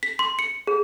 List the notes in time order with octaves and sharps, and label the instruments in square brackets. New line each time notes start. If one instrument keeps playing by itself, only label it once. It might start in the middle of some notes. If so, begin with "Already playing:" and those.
[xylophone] B6
C6
C#7
G#4